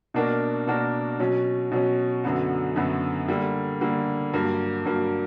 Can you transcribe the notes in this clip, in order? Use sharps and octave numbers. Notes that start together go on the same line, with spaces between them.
B2 A#3 D4 F#4 A#4
B2 A#3 D4 F#4 A#4
B2 F#3 C#4
B2 F#3 C#4
F#2 D3 F#3 B3 F#4
F#2 D3 F#3 B3 F#4
D3 G3 A#3
D3 G3 A#3
G2 F#3 A#3
G2 F#3 A#3